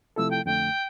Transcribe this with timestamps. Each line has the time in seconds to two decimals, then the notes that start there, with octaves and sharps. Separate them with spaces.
0.16 C3 F3 A3 E4 A4 E6
0.31 G5
0.46 F2 D3 A3 G5